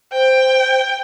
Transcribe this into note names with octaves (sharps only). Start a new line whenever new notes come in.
C5 G5